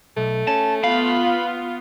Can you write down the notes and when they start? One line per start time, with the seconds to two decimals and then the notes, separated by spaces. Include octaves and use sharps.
0.17 B1 A3
0.48 C#4 A5
0.84 B3 F4 F5 B5